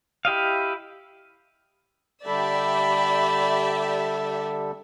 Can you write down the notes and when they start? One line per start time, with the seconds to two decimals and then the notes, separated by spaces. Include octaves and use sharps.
0.25 E4 G4 D#5 F5
2.26 D3 G3 G4 A4 D5 E5 B5